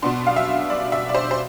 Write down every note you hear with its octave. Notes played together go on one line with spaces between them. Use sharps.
B2 B3 D4 C6
F5
E5
D5
E5
D5
C5
C5